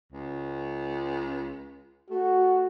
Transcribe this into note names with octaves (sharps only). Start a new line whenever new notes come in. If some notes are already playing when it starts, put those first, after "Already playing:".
C#2
A3 F#4